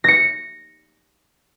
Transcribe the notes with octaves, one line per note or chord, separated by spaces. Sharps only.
A#6 C#7